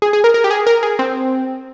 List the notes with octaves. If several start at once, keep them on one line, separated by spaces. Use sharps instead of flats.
G#4
G#4
A#4
A#4
G4
G#4
A#4
G#4
C4